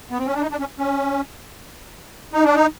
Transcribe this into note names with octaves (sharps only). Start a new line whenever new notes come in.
B3
C4
C#4
D4
D#4
D4
C#4
C#4
D#4
D4
D#4